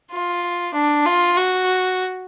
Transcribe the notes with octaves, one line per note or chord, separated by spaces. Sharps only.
F4
D4
F4
F#4